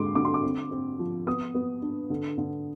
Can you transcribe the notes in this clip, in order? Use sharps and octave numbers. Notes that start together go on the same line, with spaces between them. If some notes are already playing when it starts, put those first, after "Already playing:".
Already playing: D3 G#3 C6 D6
D3 D6
C6
D6
C4
C4
F3
B3 D#6
B3
D4
D3
D3